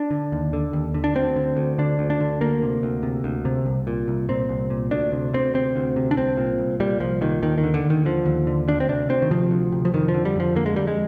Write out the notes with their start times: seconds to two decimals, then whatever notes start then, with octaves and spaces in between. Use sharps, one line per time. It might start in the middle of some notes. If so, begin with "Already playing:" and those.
Already playing: D4
0.11 D3
0.32 D#2
0.53 D3
0.73 D#2
0.94 D3
1.04 D4
1.15 D2 C4
1.36 D3
1.57 D2
1.78 D3 D4
1.99 D2
2.10 D4
2.20 D3
2.41 D2 A#3
2.62 C3
2.83 D2
3.03 C3
3.24 D2
3.45 C3
3.66 C2
3.87 A#2
4.08 C2
4.29 A#2 C4
4.49 C2
4.70 A#2
4.91 D2 D4
5.13 C3
5.34 D2 C4
5.54 C3 C4
5.76 D2
5.96 C3
6.11 D4
6.16 C2 C4
6.37 A#2
6.58 C2
6.80 A#2 G3
7.00 C2 F3
7.21 A#2 D#3
7.42 D#2 D#3
7.58 D#3
7.64 D3
7.74 D3
7.84 D#2
7.90 D#3
8.05 D3 F3
8.26 D#2
8.47 D3
8.68 D2 D4
8.80 C4
8.89 C3 D4
9.09 D2 C4
9.22 D#3
9.30 C3 F3
9.51 D2
9.72 C3
9.85 F3
9.94 F2 D#3
10.08 F3
10.14 D3
10.25 G3
10.36 F2 F3
10.55 D3 A#3
10.66 G#3
10.76 F2 G3
10.87 G#3